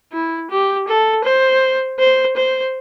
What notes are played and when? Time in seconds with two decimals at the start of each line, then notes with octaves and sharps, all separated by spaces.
0.12 E4
0.50 G4
0.88 A4
1.24 C5
1.99 C5
2.36 C5